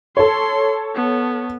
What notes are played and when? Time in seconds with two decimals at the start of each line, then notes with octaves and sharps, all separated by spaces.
0.17 A4 C#5 C6
0.96 B3